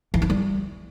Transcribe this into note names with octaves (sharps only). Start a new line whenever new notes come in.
E3
E4
G3